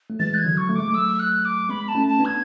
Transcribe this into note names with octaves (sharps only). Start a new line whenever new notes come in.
A3
E3 G#3 A6
F#6
G#6
D3 F#3
C#6
A3
G#3 D6
F#3 A3
E6
F#6
D6
G#3 B3 B5
A5
A3 C#4
A5
B3 D4
G#6